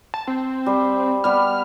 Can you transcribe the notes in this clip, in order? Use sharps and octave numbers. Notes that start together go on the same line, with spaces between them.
A5
C4
G3
G3 B3 F6